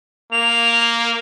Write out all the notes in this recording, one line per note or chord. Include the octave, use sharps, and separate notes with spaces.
A#3 F7